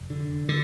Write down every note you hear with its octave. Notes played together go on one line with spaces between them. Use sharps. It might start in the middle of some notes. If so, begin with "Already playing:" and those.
Already playing: F1
D3
D3